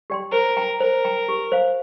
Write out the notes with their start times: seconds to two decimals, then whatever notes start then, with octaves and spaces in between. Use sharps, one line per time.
0.10 G4 D5 G5 C6
0.33 A#4 C5
0.57 G5 A#5
0.80 A#4 C5
1.05 G5 A#5
1.29 G4
1.52 C5 F5